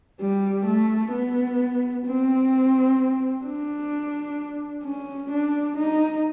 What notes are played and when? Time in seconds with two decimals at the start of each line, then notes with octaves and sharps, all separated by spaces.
0.20 G3
0.66 A3
1.12 B3
2.06 C4
3.44 D4
4.84 C#4
5.30 D4
5.77 D#4